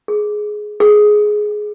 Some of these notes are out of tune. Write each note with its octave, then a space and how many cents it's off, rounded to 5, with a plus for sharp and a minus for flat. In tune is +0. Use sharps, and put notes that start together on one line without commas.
G#4 +15
G#4 +10